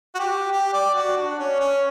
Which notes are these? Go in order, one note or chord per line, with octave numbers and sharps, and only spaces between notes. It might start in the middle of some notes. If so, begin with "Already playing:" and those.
F#4
G4
G4
D5
F#4
D4
C#4
C#4